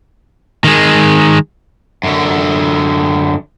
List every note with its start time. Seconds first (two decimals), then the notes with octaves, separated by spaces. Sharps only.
0.65 D#3 G#3
2.03 F#2 D3